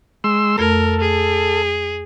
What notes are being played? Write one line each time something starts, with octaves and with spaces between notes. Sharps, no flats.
G#3 C6 E6
F2 A3 A4 A#4 B5
G#4